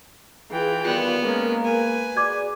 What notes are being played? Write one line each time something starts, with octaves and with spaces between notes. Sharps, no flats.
E3 F4 G#4 G5
D#3 G3 B3 F4
G#3 A#3 C#4 A#4
B4 G#5
F#4 G#4 D5 D6 G#6